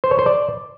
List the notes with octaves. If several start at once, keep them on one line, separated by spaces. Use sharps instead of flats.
C5
C#5
C5
D5